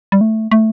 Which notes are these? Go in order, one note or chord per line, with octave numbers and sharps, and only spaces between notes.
G3
A3
A3